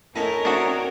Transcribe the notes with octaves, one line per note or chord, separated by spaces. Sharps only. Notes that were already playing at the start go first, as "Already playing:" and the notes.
A2 C#4 D#4 A4 A#4
A3 C4 D4 D#4 F#4